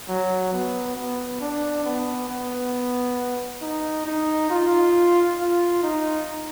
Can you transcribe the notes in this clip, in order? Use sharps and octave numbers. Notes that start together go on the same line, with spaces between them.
F#3
B3
B3
D4
B3
B3
D#4
D#4
F4
F4
D#4